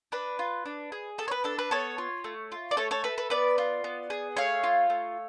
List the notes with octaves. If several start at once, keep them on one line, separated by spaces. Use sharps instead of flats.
D4 B4
F4
D4
G#4
B3 A4
C#5
B4
D4 A4
B4
B3 A4 C#5
F4
A3
F4
D5
A3 A4 C#5
A4 C#5
A4 B4
B4
B3 B4 D5
F4
B3
G#4
A3 C#5 F5
F4
A3